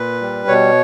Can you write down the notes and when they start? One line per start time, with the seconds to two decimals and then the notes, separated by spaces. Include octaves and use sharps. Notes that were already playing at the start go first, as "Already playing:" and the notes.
Already playing: A#2 B4
0.21 G3
0.48 B2 C#5